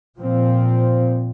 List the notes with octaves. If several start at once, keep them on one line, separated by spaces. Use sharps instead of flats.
A#2 F3 C4